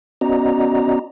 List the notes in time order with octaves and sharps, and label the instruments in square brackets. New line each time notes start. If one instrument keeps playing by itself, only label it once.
[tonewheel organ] B3 C#4 F#4 D5 D#5 A#5